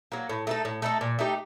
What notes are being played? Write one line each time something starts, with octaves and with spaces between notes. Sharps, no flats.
F#3 A#3
A2
A3 D#4 A4
A2
A3 D#4 A4
A#2
A3 D#4 G4